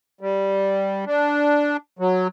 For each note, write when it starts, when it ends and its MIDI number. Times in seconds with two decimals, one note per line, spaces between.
0.21 1.05 55
1.06 1.77 62
1.99 2.27 54